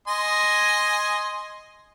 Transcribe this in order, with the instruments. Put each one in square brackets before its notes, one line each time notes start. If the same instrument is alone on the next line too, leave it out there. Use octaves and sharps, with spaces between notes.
[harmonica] D#5 G#5 C6